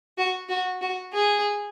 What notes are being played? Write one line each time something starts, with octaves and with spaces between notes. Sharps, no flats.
F#4
F#4
F#4
G#4